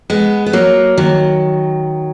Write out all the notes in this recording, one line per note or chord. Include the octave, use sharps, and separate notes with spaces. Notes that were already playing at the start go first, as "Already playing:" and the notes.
G#3 B3
B3
F#3 A#3
D#3 F#3